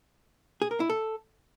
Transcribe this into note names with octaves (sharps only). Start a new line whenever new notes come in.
G#4
A#4
E4
A4